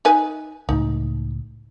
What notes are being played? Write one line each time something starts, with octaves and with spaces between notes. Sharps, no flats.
D#4 B4 G#5
C#2 A2 D#4